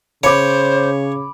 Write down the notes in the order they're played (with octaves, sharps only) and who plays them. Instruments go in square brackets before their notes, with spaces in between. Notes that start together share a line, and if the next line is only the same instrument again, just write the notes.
[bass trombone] C#3 [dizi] C5 [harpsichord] C#5 [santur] B5 D6